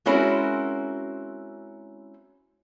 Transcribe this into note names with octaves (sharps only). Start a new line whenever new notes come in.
G#3 C4 C#4 E4 F#4 A#4